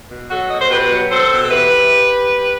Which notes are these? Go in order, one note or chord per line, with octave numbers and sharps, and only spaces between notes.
B2
F#3 F#4 A4
B2 D#5
C5
B2 G4 B4
F#3
C4 A4 C5
B2
A4
E3 G4 B4
E3